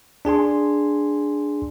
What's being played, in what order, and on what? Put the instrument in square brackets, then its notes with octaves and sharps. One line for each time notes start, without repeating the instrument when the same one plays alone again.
[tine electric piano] D4 G#4 G#5 C6